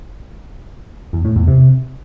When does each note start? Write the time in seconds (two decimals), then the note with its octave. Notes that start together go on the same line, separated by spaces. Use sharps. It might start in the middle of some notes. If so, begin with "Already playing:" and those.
1.13 E2
1.25 A2
1.36 E2
1.47 C3